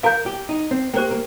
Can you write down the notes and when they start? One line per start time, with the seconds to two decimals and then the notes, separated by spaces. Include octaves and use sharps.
0.03 A#4 F5 A#5 G6
0.26 G4
0.49 D#4
0.71 C4
0.93 A#3 G4 C5 G5
1.11 A#3